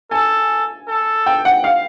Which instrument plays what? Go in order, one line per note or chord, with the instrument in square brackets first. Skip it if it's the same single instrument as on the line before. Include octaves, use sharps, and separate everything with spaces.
[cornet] A4 [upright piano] G#5
[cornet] A4
[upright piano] G5
F#5
F5